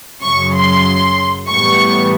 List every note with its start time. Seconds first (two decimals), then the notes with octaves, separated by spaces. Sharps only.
0.22 F#2 C#3 F#3 C#6
0.55 C6
1.50 A2 E3 G3 B3 C#6